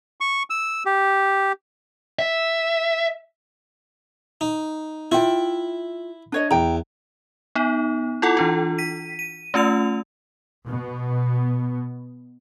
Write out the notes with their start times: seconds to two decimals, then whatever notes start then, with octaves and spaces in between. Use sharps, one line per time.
0.21 C#6
0.50 E6
0.86 G4
2.19 E5
4.41 D#4
5.12 E4 F4 G5
6.32 D4 C#5 D#5
6.51 E2 G5 A#5
7.55 B3 D#4
8.22 E4 F4 A4 F#5
8.37 E3 D4 F4
8.78 B6 D#7
9.19 D#7
9.54 A3 C#4 F4 E6 F7
10.67 B2 B3